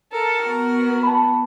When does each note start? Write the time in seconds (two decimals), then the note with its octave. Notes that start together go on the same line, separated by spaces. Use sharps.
0.12 A4 A#4 A5
0.44 B3 F#4
1.03 A5 B5